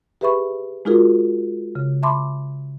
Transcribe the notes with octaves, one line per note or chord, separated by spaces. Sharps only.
G4 G#4 B4 E5 B5 C#6
G#3 D#4 F4 F#4 G#4 A#4
C#3
E5 A5 B5 C6 D6